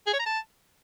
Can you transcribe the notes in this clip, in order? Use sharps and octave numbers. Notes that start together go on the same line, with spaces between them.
G#4
C#5
A#5
A5